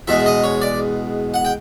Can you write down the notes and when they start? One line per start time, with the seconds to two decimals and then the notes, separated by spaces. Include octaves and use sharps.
0.07 E2 B2 G#3 E5
0.26 D#5
0.44 C#5
0.62 D5
1.34 F#5
1.45 G5